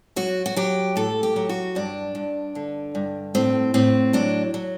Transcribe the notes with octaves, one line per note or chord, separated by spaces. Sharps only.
F#3 F#4
F#4
F#3 G4
A2 A4
G4
F#3
F#4
G2 D4
G2
D3
G2
A2 C4
A2 C4
F#3 D4
F#3